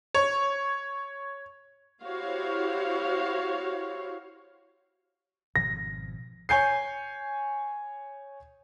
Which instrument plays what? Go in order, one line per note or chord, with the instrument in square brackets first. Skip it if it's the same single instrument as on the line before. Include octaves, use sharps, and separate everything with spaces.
[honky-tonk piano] C#5
[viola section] E4 F#4 G4 C5 C#5 F5
[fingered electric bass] G#1 B2 F3 [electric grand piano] A#6
[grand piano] C#5 G#5 G6 C7